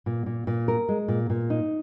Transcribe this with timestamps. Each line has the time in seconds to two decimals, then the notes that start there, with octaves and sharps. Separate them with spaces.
0.06 A#2
0.26 A#2
0.47 A#2
0.68 A#4
0.89 G#3
1.08 A#2
1.30 A#2
1.50 D#4